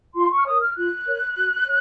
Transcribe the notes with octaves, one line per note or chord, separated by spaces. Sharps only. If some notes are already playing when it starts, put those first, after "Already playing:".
F4 C6
C#6
F6
A#4 C#5 D#6
F6
F4 F#6
A#4 C#5
F#4
C#5